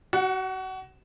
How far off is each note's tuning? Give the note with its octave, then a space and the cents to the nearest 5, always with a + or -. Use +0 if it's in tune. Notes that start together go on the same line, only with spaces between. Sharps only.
F#4 +30 F#5 -5